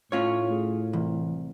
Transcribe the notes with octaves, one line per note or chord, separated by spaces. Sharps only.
A2 A3 C#4 F4 C#5
G#4
C2 E3